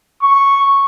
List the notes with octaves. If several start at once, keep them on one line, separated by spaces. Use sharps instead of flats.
C#6